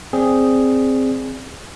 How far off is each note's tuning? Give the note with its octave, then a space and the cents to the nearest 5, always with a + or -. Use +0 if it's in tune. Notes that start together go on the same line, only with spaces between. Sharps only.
C4 +0 G#4 +0 D5 +0